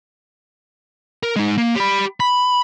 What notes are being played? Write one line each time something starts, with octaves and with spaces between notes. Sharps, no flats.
A#4
G#3 D#4
A#3
G4 B5
B5